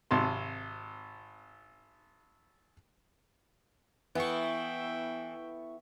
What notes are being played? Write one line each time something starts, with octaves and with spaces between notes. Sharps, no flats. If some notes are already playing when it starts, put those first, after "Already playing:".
G#1 C3 A5 C6
E3 B3 E4 A4 E5 G5 C#6